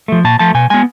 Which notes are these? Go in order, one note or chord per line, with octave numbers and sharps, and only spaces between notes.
F3 A3
A#2 A5
F3 A3 A5
B2 G#5
G#3 B3 G#5